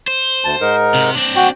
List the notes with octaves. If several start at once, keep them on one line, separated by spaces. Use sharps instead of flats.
C5
D2 A5
G#2 D#4 A#4
C3
C4 D4
F#4 G5